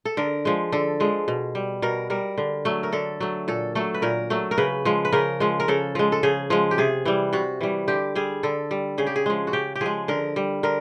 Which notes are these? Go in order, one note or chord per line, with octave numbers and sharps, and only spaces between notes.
A4
D3 A#4
F3 G#3
D3 A4
F3 G#3
B2
G3
B2 A#4
G3 A#4
D3
F#3 A3
A#4
D3 A4
F#3 A3
A#2 A4
F#3 A3 A4
B4
A#2 A#4
F#3 A3
A#4
C#3 B4
F3 G#3
B4
C#3 A#4
F3 G#3
A#4
C#3 A4
F3 G#3
A4
C#3 G#4
F3 G#3
G4
C3 G#4
E3 G3
C3 F#4
E3 G3
D3 G4
G3 G#4
D3 A4
G3
C#3 G#4
G4
G#4
F3 G#3
F#4
C#3 G4
G4
F3 G#3 G#4
D3 A#4
G3
D3 A#4